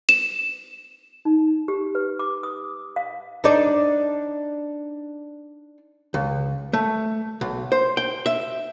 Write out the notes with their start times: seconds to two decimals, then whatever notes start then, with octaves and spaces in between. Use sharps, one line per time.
0.09 E7
1.25 D#4
1.68 G4
1.95 B4
2.19 D6
2.43 D#6
2.96 F5
3.44 D4 D#4 D5
6.14 C#2
6.73 A3
7.41 B1
7.72 C5
7.97 G5
8.26 E5